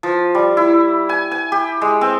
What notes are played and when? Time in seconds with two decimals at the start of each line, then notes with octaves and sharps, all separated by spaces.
0.03 F3
0.35 G3
0.57 E4
1.09 G#5
1.31 G#5
1.52 G4
1.81 G#3
2.01 C4